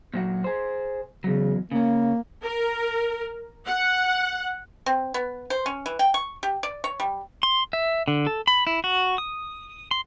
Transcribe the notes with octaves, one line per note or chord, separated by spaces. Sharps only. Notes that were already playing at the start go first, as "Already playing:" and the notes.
A#2 F#3 F#4
G#4 C5
E2 C#3 F#3
C#3 A#3 C#4
A#4
F#5
C4
B3
C5
C#4
E3
G5
C#6
G4
D5
C#5
G3
C6
E5
D3
A4
B5
E4
F#4
D#6
C6